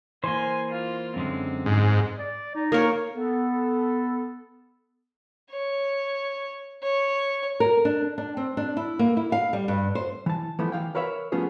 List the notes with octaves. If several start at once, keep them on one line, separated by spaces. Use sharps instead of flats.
E3 A#3 C5 G#5 C6
F4
F#2 D3 G#3 C4
G#2
D5
D#4
A#3 A#4 C#5
B3 A4
C#5
C#5
A#4
D4
D4
C4
D4
E4
A#3
E4
F5
G3
G2
C5
E3 A5
E3 F3 A3 B3 E4
E3 F5 G5
A#4 B4 C#5 E5 F5 B5
F3 A3 B3 C#4 F4 G#4